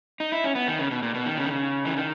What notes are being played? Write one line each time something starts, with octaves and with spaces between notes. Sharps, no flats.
D#4
E4
C#4
B3
D#3
C#3
B2
A#2
B2
D#3
C#3
D#3
C#3
E3
D#3